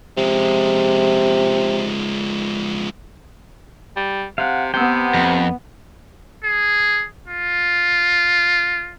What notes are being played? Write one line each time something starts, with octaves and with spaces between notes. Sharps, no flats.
C3 F3 G#3
G3
C3 F5 F#5
C3 B3 G5 E6
F2
G#4
F4